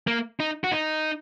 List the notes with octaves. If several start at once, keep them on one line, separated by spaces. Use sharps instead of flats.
A#3
D#4
F#4
D#4